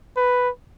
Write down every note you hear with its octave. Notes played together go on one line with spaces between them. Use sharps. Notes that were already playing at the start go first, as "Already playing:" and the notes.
B4